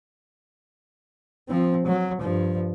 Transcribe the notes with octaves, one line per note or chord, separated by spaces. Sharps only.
F3 C4
F#3
G2 F3